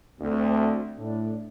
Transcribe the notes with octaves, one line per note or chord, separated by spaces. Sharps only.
D2 C4
A2 D4